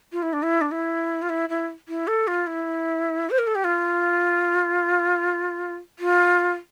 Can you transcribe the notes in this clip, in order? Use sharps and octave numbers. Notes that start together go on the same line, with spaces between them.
F4
E4
D4
E4
D4
E4
F4
E4
E4
E4
A4
F4
E4
C5
A#4
A4
G4
F4
F4